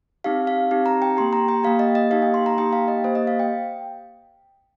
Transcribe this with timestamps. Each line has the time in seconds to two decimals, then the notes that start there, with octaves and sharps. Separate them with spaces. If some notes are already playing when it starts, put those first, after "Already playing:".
0.24 C4 D#4 G4 F5
0.47 F5
0.71 C4 D#4 G4
0.86 A#5
1.02 G5
1.17 A#3 G4 C6
1.33 A#5
1.48 G5
1.64 A#3 G4 F5
1.79 D#5
1.95 D#5
2.11 A#3 D#4 G4 F5
2.22 G5
2.34 C6
2.46 A#5
2.57 A#3 D#4 G4 G5
2.73 F5
2.88 D#5
3.04 A#3 G4 C5
3.15 D#5
3.27 F5
3.39 G5